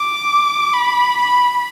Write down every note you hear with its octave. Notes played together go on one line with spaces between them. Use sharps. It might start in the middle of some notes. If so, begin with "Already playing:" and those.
Already playing: D6
B5
B5